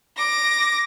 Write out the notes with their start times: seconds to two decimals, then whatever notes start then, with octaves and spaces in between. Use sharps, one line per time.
0.17 D6 A#6